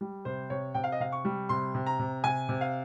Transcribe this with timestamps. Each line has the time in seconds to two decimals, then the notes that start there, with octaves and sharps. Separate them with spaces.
0.01 G3
0.25 C3 C5
0.50 C3 C#5
0.75 C3 G5
0.84 F5
0.92 D#5
1.00 C3 F5
1.12 C#6
1.25 G3
1.49 C3 C6
1.74 C3
1.87 A#5
1.99 C3
2.24 C3 G#5
2.49 C3
2.61 F5